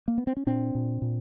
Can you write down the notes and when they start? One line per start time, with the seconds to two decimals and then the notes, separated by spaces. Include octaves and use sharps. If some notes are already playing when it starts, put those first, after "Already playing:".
0.08 A#3
0.18 B3
0.27 C4
0.37 C#4
0.47 A#2 C4 D4
0.75 A#2
1.02 A#2